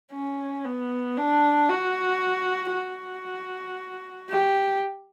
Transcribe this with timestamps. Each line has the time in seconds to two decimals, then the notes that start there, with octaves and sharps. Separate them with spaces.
0.12 C#4
0.64 B3
1.17 D4
1.69 F#4
2.73 F#4
4.30 G4